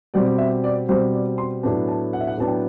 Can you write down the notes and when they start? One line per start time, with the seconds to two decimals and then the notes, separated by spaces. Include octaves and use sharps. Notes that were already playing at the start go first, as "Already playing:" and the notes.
0.14 B2 G3 C4 D5
0.38 E5
0.64 D5
0.88 B2 G3 C4 C5
1.13 D5
1.38 C6
1.63 A2 F#3 B3 D4 A5
1.88 A5
2.13 F#5
2.21 E5
2.27 F#5
2.38 A2 F#3 B3 D4 A5
2.48 G5